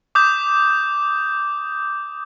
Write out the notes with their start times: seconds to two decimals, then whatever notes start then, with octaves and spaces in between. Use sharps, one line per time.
0.15 D6 D#6 G6